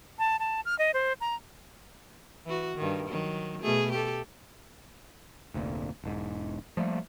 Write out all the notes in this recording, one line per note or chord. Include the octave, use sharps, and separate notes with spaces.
A5
A5
F6
D#5
C5
A#5
E3 F#4
G2 D#3
D#3 F#3
B2 A3 G#4
G4 A4
F1 D2 A#2
E1 G#2
F3 G3 A3 A#3